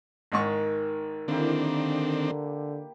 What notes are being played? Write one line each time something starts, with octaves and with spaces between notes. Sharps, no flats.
G#1 G#2 D#3 C#6
D3 D#3 A#3 C4 D4 E4 G4